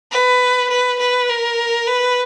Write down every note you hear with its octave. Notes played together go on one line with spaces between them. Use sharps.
B4
B4
B4
A#4
B4